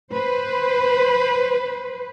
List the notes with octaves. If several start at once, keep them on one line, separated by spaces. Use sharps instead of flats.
B4 C5